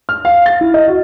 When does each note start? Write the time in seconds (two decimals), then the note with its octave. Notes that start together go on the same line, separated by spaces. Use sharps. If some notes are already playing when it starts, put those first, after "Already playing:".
0.09 F6
0.25 F5
0.46 A6
0.61 E4
0.74 D#5
0.88 F#4